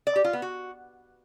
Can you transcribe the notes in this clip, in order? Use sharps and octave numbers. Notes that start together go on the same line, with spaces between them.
D5
G4
F4
B3
F#4